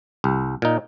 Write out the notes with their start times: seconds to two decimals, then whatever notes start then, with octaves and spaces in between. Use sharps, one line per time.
0.24 C2
0.62 A#2 D#4